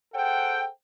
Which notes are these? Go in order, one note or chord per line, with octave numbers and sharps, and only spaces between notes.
G#4 A4 C5 F#5 G5